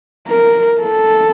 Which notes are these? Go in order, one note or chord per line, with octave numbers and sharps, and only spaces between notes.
A#4
A4